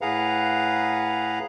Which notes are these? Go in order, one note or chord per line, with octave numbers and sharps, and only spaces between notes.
A2 G#4 B4 F5 F#5 A#5